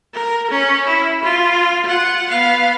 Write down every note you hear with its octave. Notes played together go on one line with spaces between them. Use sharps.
A#4
C#4
E4
F4
F4 F#5
B3 F5